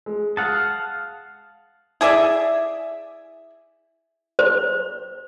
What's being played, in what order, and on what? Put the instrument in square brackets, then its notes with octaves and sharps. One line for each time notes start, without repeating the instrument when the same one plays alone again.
[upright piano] G#3
[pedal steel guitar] F5 F#5 A5 [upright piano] D#6
[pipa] E4 G#4 D5 E5
[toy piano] C5